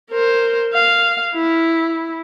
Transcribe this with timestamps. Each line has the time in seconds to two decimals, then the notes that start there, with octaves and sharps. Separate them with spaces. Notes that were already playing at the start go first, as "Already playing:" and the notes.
0.10 A#4 C5
0.73 F5
1.34 E4